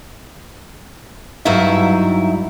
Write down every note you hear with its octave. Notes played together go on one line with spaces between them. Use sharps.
G2 F#3 D#4 E4 E5